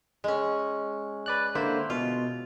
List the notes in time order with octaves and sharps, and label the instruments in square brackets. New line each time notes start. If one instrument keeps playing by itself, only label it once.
[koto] G#3 C#4
[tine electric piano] B4 D5 F#6
[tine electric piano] D3 A#3 C5 [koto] E4
[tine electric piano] B2 [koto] F4